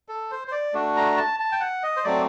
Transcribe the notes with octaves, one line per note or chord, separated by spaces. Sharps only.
A4
C5
C5
D5
A3 D4 F#4
A#5
A5
A5
G5
F#5
D#5
C5
F#3 A3 C4 D5